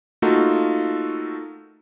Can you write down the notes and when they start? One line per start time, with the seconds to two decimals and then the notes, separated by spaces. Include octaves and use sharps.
0.22 A3 A#3 D#4 F4 F#4 A4